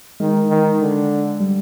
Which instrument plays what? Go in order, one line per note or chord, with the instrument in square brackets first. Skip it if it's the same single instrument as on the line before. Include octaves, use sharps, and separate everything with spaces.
[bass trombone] D#3 [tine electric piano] G#3
[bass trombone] D#3
D3
[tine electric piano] G3